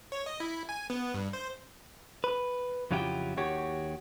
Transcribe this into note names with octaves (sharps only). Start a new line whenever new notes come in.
C#5
D#5
E4
G#5
B3
G2
C5
B4
F2 C#3 F#3 E4 F4 G4
D#2 D#3 F#4 G4 C#5